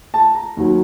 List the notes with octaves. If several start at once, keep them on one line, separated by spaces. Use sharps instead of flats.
A5
A#5
D#2 D#3 F#3